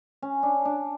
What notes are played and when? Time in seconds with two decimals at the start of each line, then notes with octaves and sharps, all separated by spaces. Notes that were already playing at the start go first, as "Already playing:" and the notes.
0.22 C#4
0.43 D4
0.65 D4